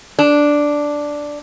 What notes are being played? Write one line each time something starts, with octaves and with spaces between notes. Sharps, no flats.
D4